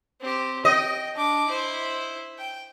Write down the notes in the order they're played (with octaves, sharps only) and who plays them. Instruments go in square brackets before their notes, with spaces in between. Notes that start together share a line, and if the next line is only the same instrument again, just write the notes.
[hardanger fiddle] C4 G4
[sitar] D#5 [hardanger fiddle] G5
[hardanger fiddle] D4 D6
E4 C5
G5